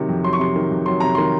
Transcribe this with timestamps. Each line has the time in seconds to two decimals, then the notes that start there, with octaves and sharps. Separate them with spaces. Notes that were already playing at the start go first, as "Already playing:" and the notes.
Already playing: C3 D#3 F#3
0.09 F2
0.24 F#3 C6
0.33 C#6
0.39 C3 C6
0.56 D#3
0.71 F2
0.86 F#3 C6
1.00 C3 A#5
1.15 D#3 C6